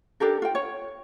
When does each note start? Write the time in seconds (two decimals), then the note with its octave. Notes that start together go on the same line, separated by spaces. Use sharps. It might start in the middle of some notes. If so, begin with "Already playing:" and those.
0.20 D4 G4 A4 A#4
0.42 F4 G5
0.55 C#5